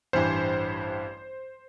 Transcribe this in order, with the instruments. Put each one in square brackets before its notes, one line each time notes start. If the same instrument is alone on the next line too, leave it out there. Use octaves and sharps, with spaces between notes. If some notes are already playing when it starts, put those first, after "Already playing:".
[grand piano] A1 G2 E3 [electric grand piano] C5